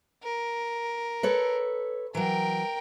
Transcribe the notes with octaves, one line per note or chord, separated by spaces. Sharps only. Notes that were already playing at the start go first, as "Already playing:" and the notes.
A#4
A4 B4 C#5
E3 F#3 A#4 G5